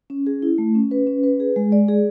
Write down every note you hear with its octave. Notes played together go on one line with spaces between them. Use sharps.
C#4
G#4
E4
A3
C#4
B4
C#4
B4
G#4
G#3
D5
G#4